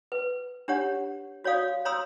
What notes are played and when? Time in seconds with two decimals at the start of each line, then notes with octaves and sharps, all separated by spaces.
0.12 B4
0.68 D4 G4 C#5 F#5
1.44 F#4 C#5 D5 F5 D#6
1.85 C#5 A#5 C6 D#6 E6